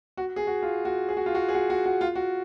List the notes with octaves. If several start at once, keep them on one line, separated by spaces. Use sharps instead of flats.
F#4
G#4
F#4
F4
F#4
G#4
F#4
F4
F#4
G#4
F#4
F#4
F#4
F4
F#4